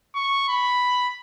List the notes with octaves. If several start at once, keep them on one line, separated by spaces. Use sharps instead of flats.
C#6
B5